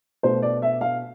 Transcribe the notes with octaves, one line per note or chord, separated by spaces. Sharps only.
B2 A3 C5
D5
E5
F5